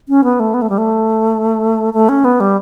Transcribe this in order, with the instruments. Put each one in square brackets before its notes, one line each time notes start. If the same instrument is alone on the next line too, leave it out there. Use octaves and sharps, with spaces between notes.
[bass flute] C#4
B3
A3
B3
A3
G3
A3
A3
C#4
B3
G3